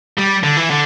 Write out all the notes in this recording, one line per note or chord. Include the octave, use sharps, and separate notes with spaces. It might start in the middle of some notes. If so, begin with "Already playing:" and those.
G3
D3
E3
D3